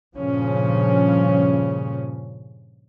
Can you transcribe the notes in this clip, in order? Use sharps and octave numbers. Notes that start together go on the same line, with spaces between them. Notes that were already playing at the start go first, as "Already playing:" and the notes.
G2 A#2 C#3 F3 C#4